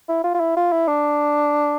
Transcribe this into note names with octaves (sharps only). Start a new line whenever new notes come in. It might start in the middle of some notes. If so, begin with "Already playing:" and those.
E4
F4
F4
E4
F4
E4
D4